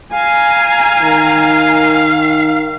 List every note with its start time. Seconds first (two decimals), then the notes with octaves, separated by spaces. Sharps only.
0.13 F5 G#5 A#5
1.01 D#3